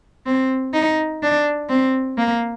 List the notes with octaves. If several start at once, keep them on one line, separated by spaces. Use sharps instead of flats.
C4
D#4
D4
C4
A#3